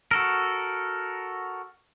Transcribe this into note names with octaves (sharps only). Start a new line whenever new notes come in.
F#4 A4 A#4